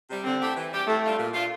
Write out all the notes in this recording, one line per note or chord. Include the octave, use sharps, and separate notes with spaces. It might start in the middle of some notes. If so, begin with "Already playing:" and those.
C3 G3
D3 C4
A3 E4 G4
E3
G3 D4 G4
A2 A3
G3 D4 F4
A#2
A3 D4 F4